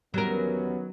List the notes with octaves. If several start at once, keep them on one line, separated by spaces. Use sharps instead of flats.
E2 D#3 F#3 G3 B3 C#4 A#4